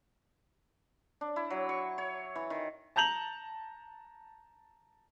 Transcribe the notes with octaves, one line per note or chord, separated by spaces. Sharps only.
D4
E4
F#3
C#6
C#5
E3
D#3
A5 A#5 G6 F7 F#7